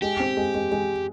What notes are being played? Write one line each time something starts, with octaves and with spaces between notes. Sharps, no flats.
G#3 G4
C4
G#3
G#3
G#3